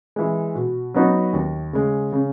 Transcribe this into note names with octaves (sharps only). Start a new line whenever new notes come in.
E3 G#3
B2
F#3 B3 D#4 F#4
D#2
C#3 G#3
C#3